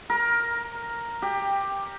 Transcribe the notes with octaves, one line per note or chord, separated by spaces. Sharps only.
A#4
G4